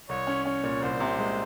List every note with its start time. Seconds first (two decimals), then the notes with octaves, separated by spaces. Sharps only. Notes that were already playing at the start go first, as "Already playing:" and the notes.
0.09 C2 C#5
0.27 C#4
0.45 C#4 C#5
0.64 A#2
0.82 C2 C5
1.00 C3
1.19 G#3